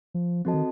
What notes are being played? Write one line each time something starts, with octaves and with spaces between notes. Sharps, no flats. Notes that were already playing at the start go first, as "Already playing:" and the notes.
F3
F3 C4 F#4 A4 D#5 A5
D#3